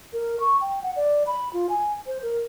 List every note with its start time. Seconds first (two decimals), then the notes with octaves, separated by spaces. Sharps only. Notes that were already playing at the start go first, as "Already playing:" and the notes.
0.13 A#4
0.40 C#6
0.61 G5
0.83 F#5
0.96 D5
1.27 B5
1.53 F4
1.69 G#5
2.07 C5
2.22 A#4